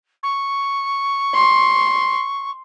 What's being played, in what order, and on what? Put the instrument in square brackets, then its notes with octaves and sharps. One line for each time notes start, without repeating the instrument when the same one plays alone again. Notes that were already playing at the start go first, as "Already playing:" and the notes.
[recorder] C#6
[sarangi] C6